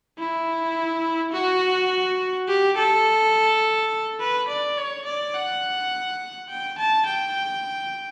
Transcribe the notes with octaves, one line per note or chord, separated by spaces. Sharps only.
E4
F#4
G4
A4
B4
D5
C#5
D5
F#5
G5
A5
G5